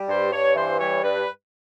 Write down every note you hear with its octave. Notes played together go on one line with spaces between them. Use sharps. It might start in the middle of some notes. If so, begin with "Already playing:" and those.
Already playing: G3
G2 C5
G2 C#5
E3 C5
G3 C#5
G2 B4